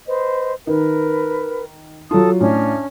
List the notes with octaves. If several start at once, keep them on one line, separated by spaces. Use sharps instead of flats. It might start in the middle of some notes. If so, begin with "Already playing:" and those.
B4 C5 D#5
D#3 A#4 B4
F#3 F4 A4 A5 D#6
A2 C#4 D4 F6